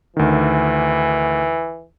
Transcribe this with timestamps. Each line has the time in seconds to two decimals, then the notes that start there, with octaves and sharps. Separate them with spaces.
0.17 D2 D#3 E3